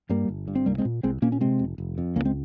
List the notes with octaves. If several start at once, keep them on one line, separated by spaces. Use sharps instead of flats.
G2 G3 A#3
G1
G2
C4
C2 G3 A#3
G#3 C4
A#2
C2 G#3 C4
A#2 A#3 C#4
C#4
C3 G#3 C4
F1
F1
F2
C#2 A#3 C#4
G#3 C4